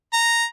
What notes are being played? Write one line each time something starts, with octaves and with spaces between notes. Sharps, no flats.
A#5